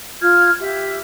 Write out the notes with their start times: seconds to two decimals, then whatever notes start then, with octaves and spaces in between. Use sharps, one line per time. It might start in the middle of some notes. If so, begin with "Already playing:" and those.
0.21 F4 F6 G#6
0.60 G4 E5